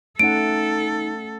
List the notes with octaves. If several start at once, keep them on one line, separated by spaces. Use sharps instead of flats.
A3 C#4 D#4 A4 F#5 D7